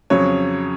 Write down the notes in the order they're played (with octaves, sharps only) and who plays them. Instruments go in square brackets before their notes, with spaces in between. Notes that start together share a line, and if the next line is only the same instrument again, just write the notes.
[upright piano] F2 C#3 F#3 C#5